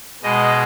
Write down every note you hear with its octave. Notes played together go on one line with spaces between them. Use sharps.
B2 G#3 D#5